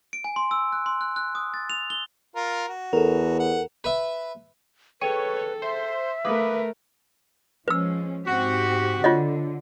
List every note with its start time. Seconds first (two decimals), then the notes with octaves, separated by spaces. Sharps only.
0.13 D7
0.24 G#5
0.36 C6
0.51 E6
0.72 F#6
0.86 C6
1.01 F#6
1.16 F#6
1.35 D#6
1.54 A6
1.70 F7
1.90 G7
2.36 F4 A#4
2.69 F#4
2.93 E2 A4 A#4
3.40 F#5
3.84 B4 E5
5.01 G#4 A4 B4 C#5 G5 D#7
5.62 C5 E5
6.25 A3 A#4 B4 F5 D6 D#6
7.68 F3 G#3 C#4 B4 E6
8.26 G#2 C4 F#4 G4
9.04 D3 F4 C#5 D#5